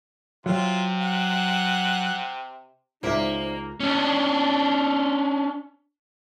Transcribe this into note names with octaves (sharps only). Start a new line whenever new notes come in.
C3 F#3 F4
F#5
C#2 A#3 D#4 C5 D5 E5
C#4 D4